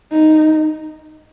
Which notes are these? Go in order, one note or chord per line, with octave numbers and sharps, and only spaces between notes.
D#4